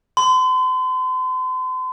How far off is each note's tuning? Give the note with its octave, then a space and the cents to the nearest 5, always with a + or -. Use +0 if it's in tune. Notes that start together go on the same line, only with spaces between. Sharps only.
C6 -40